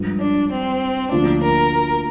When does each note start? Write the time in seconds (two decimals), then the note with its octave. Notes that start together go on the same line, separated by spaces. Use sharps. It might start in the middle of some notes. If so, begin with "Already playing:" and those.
Already playing: G2 F3 G#3
0.20 D4
0.51 C4
1.11 D2 D3 F3 A#3 D4 F4
1.42 A#4